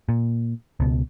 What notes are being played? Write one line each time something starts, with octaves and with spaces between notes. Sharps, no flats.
A#2
C#2 B2